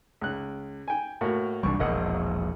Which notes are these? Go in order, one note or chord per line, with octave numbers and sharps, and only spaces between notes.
C#2 F#6
G5 G#5
A2 A#3 F#4
C2 E3 G3 D4 C#6
E1 A#1 A#4 D#5 F#5